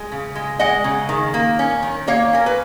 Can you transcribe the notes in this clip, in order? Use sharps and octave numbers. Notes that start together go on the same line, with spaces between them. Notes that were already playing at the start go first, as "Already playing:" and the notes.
Already playing: G#3
C#3
G#3
G#3 D#5 F#5
C#3
D#3
A#3
C#4
D#3
A#3 C#5 F5
C#4 A#4
B4